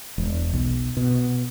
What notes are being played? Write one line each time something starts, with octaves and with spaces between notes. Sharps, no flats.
E1
B1
B2